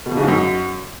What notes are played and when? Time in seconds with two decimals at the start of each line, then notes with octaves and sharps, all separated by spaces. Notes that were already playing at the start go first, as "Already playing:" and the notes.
0.06 B2
0.11 F2
0.17 C#3
0.23 G#2
0.28 F#2